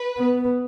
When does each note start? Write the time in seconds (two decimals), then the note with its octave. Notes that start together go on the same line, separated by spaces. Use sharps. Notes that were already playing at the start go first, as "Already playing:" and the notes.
Already playing: B4
0.18 B3